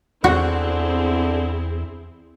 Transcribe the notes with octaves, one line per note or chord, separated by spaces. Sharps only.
E2 D3 C4 E4 F#4 G#4